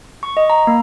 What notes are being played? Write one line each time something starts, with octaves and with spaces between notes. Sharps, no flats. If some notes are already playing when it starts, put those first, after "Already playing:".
C#6
D#5
A#5
A#3